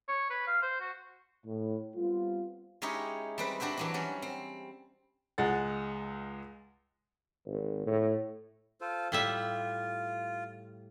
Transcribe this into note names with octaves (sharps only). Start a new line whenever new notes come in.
C#5
B4
F5
C5
F#4
A2
G3 B3 C4 F4
G#3 C#4 D#4 E4 G4 C#5
G3 C4 B4
G3 D4 F#4 C5 E5
E3 F#3 D4
F#3 G3 C#4
C4
C#2 G#3 F#5 A6
G#1
A2
F4 A4 C5
A2 G3 F4 E5